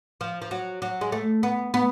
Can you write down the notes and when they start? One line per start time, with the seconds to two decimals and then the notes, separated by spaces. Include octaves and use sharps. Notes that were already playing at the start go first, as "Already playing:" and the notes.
0.21 F3
0.42 F3
0.51 F#3
0.82 F#3
1.01 G#3
1.12 A3
1.43 B3
1.74 B3